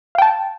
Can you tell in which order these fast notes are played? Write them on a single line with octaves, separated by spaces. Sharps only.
F5 G5 A5